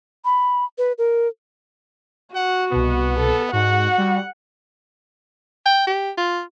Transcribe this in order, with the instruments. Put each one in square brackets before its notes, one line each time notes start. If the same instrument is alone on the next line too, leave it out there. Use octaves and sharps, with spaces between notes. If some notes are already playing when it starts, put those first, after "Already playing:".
[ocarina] B5
B4
A#4
[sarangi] F#4 [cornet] F#5
[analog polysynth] C2 B2 [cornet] B3
[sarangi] A4
[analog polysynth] G#2 [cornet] F#4 [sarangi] F#5
[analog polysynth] G3
[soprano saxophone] G5
G4
F4